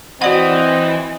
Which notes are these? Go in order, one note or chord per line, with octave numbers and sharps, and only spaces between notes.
E3 C4 F#4 D5 D#5 F#5